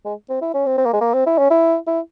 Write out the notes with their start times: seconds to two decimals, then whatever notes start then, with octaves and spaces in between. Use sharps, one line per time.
0.05 G#3
0.29 C4
0.41 E4
0.54 C#4
0.66 C4
0.78 C4
0.85 A#3
0.93 G#3
1.01 A#3
1.14 C4
1.26 E4
1.38 C#4
1.50 E4
1.87 E4